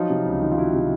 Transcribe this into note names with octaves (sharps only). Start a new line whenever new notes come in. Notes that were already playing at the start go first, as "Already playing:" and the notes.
Already playing: F3 F#3 D#4 F4
C3
C#2
D#3
F4
F#3 E4 F#4
C3